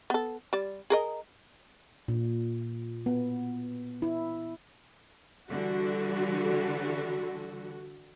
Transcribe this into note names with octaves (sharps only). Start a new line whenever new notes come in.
B3 A4
G3 D5
G#4 A#4 D#5
A#2
B3
E4
D3 E3 G3 F#4 A4